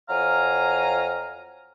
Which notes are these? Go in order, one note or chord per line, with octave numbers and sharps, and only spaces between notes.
F2 F#3 F5 G#5 A#5 F6